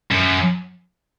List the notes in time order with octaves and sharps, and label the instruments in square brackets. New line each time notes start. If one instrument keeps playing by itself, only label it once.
[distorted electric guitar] F#2